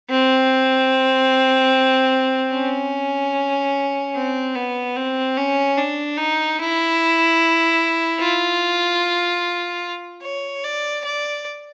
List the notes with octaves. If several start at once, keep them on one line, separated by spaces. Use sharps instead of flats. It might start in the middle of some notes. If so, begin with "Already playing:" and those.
C4
C#4
C4
B3
C4
C#4
D4
D#4
E4
F4
C#5
D5
D5